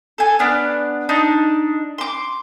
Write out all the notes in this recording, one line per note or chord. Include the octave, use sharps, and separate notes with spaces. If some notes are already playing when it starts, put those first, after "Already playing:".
A4 G#5
B3 D4 D5 F6
D4 D#4
C6 D6